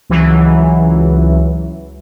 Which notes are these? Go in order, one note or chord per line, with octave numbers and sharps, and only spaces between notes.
C#2 E3 F#3